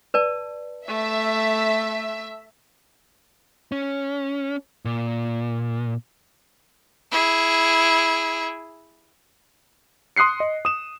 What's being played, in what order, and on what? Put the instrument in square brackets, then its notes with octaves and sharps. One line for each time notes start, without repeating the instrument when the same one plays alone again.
[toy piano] B4 D5 A5
[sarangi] A3 [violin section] E5
[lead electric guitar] C#4
A#2
[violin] E4 G#4
[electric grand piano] C6 D#6 F#6 C7 C#7
D#5
D#6 E7